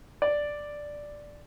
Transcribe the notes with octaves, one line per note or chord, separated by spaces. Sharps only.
D5